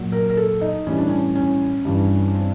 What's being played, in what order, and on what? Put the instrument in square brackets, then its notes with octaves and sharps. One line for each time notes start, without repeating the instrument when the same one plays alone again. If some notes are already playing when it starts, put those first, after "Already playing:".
Already playing: [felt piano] A#2 F#3
A#4
A#4
A4
D#4
A2 E3 G3 C#4
D4
C#4
C#4
G2 E3 G3
C4